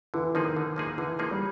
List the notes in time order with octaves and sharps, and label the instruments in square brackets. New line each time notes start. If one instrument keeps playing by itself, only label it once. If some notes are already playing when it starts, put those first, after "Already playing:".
[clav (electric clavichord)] D3 [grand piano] E3
[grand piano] D#3 [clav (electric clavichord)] F3 A#3 D#4 G#4
[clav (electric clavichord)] D3
F3 A#3 D#4 G#4
[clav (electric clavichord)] D3 [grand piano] E3
[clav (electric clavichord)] F3 A#3 D#4 G#4
[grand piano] G3